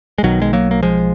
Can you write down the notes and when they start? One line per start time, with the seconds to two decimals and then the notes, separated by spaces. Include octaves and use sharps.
0.18 G#3
0.23 B1 B2 D#3 F#3
0.42 G#3
0.53 F#3 A#3
0.71 A#3
0.83 F3 G#3